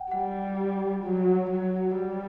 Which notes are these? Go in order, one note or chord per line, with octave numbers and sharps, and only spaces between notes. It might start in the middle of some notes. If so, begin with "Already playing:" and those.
Already playing: F#5 G5
G3 F#5
F#3
F#3
G3